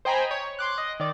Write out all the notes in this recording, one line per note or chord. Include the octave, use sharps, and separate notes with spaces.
C5 D#5 G5 G#5 A#5 B5
C#5
C6 D6 F#6
D#5
D#3 D5